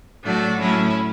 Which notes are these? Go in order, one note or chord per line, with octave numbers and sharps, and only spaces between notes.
A2 F#3 A3 D4 F#4
A2 F#3 A3 C#4 E4